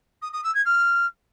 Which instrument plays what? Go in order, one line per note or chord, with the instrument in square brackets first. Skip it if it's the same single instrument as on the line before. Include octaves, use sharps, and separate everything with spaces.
[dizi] D#6
D#6
E6
G#6
F6